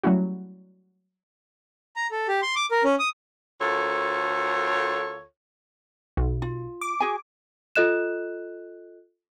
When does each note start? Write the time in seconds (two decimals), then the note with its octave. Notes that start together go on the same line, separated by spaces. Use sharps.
0.03 F#3 G3 A3 C#4 E4 F#4
1.96 A#5
2.11 A4
2.28 G4
2.42 C6
2.56 D6
2.71 A#4
2.84 C#4
2.99 D#6
3.61 D2 F4 A4 A#4 C#5
6.17 B1
6.42 F4
6.81 D6
7.00 F#4 G#4 G#5
7.76 F4 A4 D#5 F#6 E7